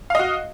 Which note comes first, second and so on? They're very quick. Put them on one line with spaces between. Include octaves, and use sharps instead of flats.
F5 D#5 F#4